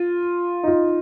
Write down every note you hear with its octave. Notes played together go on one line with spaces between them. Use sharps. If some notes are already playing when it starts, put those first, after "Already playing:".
Already playing: F4
D#4
F4